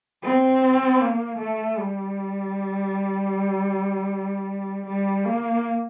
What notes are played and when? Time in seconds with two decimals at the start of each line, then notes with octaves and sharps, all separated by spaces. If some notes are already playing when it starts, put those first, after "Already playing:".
0.23 C4
1.01 A#3
1.39 A3
1.78 G3
4.86 G3
5.25 A#3